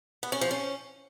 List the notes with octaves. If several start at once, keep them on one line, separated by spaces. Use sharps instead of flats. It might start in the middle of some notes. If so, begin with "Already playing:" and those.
B3
C#4
F3
C#4